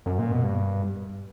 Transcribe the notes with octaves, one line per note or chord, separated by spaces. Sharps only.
F#2
A#2
B2
G2